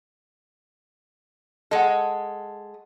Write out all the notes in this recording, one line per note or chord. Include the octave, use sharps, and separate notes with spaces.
G#3 A4 D#5 F#5